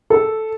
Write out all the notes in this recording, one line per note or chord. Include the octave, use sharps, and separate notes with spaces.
A4